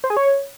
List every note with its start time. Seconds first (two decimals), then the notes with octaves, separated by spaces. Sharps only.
0.04 C5
0.10 G#4
0.17 C#5